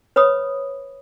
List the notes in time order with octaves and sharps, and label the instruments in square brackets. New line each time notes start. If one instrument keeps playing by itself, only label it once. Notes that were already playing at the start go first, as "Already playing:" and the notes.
[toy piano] B4 C#5 B5 D#6